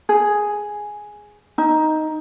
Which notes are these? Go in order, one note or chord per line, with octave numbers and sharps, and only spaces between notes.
G#4
D#4